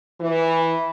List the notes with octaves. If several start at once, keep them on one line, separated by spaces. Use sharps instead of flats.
E3